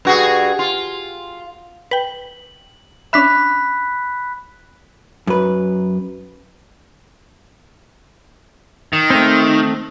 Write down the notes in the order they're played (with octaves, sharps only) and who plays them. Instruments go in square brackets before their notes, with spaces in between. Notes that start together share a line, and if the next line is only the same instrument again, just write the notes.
[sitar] G2 F#4 G#4
F4
[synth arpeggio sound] B4 G5 [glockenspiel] F#7
[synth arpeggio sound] C#4 D4 E5 [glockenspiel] B5 F#6 B6
[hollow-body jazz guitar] F#2 B4
[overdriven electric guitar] D#3
[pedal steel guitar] A3 C4